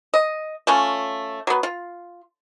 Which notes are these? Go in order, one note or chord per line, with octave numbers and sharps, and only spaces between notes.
D#5
A3 C#4 F4
F#3 B3
F4